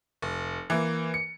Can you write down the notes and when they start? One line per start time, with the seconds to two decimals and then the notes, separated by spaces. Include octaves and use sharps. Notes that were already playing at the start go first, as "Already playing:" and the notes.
0.22 F1
0.70 E3 A#3
1.14 C#7